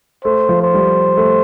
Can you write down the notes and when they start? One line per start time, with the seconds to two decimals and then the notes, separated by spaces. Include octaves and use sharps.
0.24 A3 C5
0.49 F3
0.62 C5
0.74 G3
1.17 A3